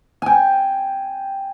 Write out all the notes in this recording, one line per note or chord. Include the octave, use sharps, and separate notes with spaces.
G5 G#5